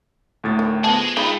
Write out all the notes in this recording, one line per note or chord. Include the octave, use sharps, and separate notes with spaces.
D2 A2 A6
D#3
F3 B3 G#4 D#5 A5
G#3 D#4 F4 A4 G5 B5